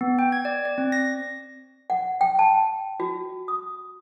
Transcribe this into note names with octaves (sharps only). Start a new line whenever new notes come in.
B3
G5
G#6
D5
D5
C4
A#6
F#5
G5
A5
F#4
D#6